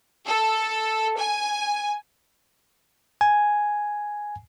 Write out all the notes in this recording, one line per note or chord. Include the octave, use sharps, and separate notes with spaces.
A4
G#5
G#5